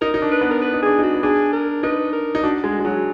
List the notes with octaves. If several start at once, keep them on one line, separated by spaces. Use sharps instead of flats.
D#4 A#4
D#4
D4
B4
B3
A#4
B4
D#4
D4 G#4
D#4
F#4
B3
D4 G#4
A#4
D#4 B4
A#4
D#4
D4 F#4
G#3
G#3
F#3